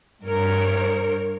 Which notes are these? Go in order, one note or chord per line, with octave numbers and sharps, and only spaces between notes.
G2 A#4 C#5